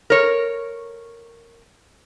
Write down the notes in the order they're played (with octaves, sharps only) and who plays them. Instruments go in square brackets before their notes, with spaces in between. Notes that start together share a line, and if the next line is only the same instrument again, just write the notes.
[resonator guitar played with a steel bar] A#4 C#5